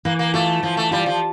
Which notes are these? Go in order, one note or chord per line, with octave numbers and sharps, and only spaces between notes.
E3 A#3
A#3
A3 F4
E3 F3
A3
G3 F4
F3